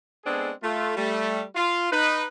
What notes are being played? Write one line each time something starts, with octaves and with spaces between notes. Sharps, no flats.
G#3 B3 C4 D4 G#4 A4
A3 F4
G3 A3
F4
D#4 B4